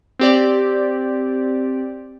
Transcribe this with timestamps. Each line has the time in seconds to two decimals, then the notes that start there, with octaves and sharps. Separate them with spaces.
0.19 C4 G4 D5